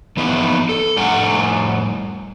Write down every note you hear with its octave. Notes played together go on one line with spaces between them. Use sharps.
E3 F3 B3 D#4 E5
A4
F2 A2 G3 F#5 G#5